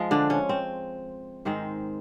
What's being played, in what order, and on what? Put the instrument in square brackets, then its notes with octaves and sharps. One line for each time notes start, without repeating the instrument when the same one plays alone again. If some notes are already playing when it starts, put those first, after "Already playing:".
Already playing: [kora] F3 G#3
D3 D4
C#4
C4
G#2 D#3 G#3 C4